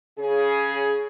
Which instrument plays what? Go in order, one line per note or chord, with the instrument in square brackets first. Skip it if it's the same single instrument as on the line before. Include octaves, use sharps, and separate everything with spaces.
[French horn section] C#3 G#4